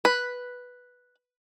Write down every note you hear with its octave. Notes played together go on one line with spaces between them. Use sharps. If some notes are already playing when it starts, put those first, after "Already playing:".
B4